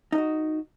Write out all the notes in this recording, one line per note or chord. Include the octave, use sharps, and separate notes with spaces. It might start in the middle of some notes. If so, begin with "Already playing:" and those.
D#4 F#4 D#5